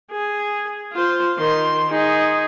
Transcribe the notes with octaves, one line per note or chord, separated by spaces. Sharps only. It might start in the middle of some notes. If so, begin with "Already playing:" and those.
G#4
F4 C5
D#3 C6
D#4 G#4